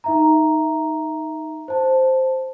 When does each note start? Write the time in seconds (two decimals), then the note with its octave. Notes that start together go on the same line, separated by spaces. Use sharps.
0.04 D#4 E5 A#5
1.68 C5 A5